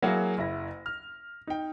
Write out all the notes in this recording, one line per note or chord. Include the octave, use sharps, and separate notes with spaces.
F#3 A#3 E4 F#4 G#4
F#1 E4 A#6
F6
D#4 G5